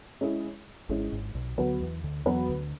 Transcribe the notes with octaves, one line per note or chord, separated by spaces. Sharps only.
G#3 C#4 E4 G#4
G#1 G#2 G#3 C#4 E4 G#4
G#1 G#2
B1 B2
D2 D3 F#3 B3 F#4 B4
E2 E3
D2 D3
E2 E3 F#3 B3 F#4 B4
D2 D3